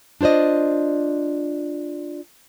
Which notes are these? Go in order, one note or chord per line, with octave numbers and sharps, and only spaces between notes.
D4 F4 C5 D5 D#5